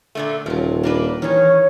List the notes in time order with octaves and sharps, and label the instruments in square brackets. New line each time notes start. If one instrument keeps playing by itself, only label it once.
[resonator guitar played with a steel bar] A#2 D3 A3
[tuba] D#1 [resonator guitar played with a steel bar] F3 F#3
[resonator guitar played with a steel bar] A#3 D4 B4
[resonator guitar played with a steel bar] D#3 C#4 [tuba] E3 [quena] C#5